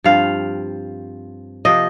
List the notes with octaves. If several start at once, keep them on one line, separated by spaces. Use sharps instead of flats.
G2 F3 C4 F5
C3 F3 A#3 D#5